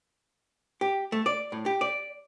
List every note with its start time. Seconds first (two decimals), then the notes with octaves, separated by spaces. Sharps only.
0.81 G4
1.12 A3
1.26 D5
1.52 A2
1.66 G4
1.81 D5